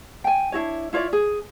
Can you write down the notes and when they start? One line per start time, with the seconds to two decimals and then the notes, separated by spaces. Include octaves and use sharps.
0.24 G5 G#5
0.52 D4 E4 F#4 C#5
0.93 E4 F4 C#5 D5
1.13 G#4